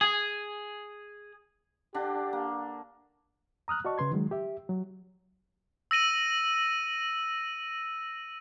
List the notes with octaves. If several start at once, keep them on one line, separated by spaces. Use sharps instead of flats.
G#4
D3 D4 G4
A#3
A#5 D#6 F6 F#6
F#4 D5 D#5 A5 C#6
C#3 B4 C6 G#6
D#3 F#3 G#3
G4 E5
F#3
E6 A#6 D#7 F#7